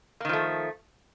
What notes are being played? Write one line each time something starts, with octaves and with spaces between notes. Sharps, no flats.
D#3 F3 A3 A#3